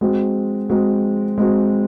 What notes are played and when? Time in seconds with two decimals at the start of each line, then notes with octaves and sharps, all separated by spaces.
0.01 G#3 C4 F#4
0.69 G#3 C4 F#4
1.38 G#3 C4 F#4